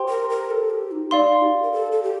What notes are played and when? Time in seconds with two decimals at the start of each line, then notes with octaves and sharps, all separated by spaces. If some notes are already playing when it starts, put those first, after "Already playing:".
Already playing: G4 C5 G5 C6
0.09 A#4
0.30 A#4
0.51 A4
0.70 G4
0.91 D#4
1.11 D#4 D5 F5 C6
1.42 G4
1.62 A#4
1.73 A4
1.92 A4
2.03 G4